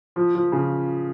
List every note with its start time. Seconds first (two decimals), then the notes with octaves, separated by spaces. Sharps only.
0.16 F3
0.35 F3
0.52 C#3